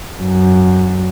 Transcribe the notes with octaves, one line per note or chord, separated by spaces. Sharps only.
F#2